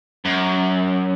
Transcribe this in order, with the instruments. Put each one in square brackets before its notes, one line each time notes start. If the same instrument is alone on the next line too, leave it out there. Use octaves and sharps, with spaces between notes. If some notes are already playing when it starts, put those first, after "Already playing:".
[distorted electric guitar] F#2